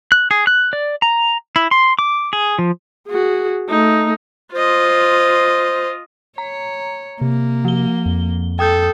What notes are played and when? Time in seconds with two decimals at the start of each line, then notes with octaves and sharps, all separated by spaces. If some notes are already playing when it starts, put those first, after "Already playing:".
0.12 F#6
0.31 G#4
0.47 F#6
0.73 D5
1.02 A#5
1.56 E4
1.71 C6
1.99 D6
2.33 G#4
2.59 F3
3.08 F#4 G#4
3.69 A3 D#4
4.54 F4 C5 D#5
6.38 C#5 A#5
7.21 C3 A#3
7.65 F3 G7
8.06 F2
8.59 A4 G5 D#6 G6